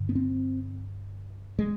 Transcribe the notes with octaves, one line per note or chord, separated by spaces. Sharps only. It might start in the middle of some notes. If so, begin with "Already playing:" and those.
Already playing: G2 D3
B3
C4
G#3